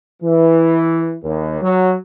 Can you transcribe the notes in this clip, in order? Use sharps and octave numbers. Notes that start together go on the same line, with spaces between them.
E3
D#2
F#3